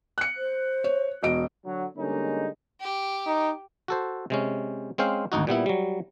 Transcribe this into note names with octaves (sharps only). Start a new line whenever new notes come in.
F#6 C#7
C5
C#5
E1 F#4 D#5 D7
D3 F#3
D3 G3 G#3 A#3 C#4 D#4
G4
D#4
F#4 A4 C5
C3 G#3 C#4
G#3 C4 C#4 C5 F5
G#1 D2 D#4 F#4
A#2 G3 B3 E4
F#3 G3